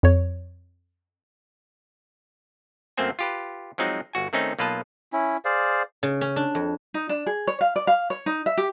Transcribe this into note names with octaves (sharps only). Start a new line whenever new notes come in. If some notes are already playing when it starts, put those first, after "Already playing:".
F2 C#5
F#2 A3 A#3 C4 C5 G#5
F4 G4 B4
F3 F#3 G#3 C4 D#4
G1 F#4 G#5
D#3 A3 C4 C#4 D#4
B1 A#3 F4 B4 D#5 A5
C#4 E4
G#4 C5 D5 F5
C#3
C#4
D4
F2
D#4
D4
G#4
C#5
F5
D5
F5
C#5
D#4
E5
G4